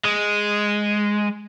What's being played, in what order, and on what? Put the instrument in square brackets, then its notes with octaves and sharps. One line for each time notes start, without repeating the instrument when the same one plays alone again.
[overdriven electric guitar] G#3